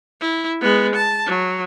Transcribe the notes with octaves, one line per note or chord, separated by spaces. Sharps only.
E4
G#3 B3
A5
F#3